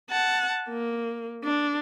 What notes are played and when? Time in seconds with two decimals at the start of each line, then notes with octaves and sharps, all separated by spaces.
0.10 F#5 A5
0.69 A#3
1.44 D4